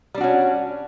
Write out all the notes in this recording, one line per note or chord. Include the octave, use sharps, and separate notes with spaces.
G3 C#4 D4 F#4